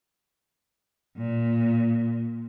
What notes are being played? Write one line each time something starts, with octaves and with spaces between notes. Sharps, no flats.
A#2